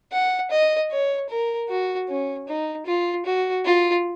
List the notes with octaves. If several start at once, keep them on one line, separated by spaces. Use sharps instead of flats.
F#5
D#5
C#5
A#4
F#4
C#4
D#4
F4
F#4
F4